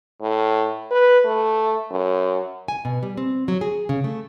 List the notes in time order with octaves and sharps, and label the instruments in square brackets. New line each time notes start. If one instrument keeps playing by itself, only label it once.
[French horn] A2
B4
A3
F#2
[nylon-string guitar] G#5
B2
G3
C4
F#3
G#4
C#3
A3